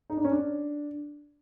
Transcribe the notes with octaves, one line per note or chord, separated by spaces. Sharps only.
D#4
D4
C#4
D4